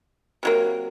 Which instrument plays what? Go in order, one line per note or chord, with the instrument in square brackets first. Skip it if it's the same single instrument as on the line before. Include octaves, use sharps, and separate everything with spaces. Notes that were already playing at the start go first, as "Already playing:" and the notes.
[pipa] C3 F#3 A#3